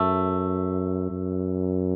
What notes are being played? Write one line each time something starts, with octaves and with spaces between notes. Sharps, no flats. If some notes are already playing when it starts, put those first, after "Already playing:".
Already playing: F#2 A3
F#2